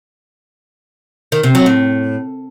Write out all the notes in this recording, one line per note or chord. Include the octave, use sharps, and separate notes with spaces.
D#3
C3
F#3
A2